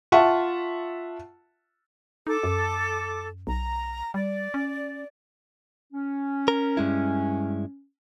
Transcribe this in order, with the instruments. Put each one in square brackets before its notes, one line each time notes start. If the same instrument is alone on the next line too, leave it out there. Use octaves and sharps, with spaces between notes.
[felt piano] F4 E5 F#5 A5 C#6
[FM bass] D#4 [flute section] A4 D6
[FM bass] F#2
[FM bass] B1 [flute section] A#5
[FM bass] G3 [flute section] D5
[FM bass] C#4
[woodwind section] C#4
[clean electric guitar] A#4
G2 G#3 E4